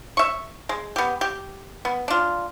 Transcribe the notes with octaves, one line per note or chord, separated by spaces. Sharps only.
E5 C#6
G#3
B3 G4
G4
B3
D4 F4